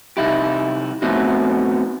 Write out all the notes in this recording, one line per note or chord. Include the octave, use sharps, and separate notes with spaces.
C3 D#4 E4 G4
A3 B3 C4 D#4 E4 F#4